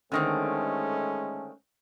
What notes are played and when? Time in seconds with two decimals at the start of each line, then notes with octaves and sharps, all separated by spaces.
0.12 D3 D#3 G#3 A3 C4 C#4